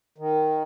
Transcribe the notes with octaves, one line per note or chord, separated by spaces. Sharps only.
D#3